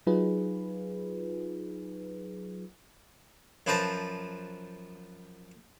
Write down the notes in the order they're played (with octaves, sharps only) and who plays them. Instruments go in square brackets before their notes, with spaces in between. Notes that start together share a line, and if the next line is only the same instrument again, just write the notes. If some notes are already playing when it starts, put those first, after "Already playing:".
[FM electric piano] F#3 D#4 F4 G#4 B4
[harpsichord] F#2 F3 B4 C5 A5 A#5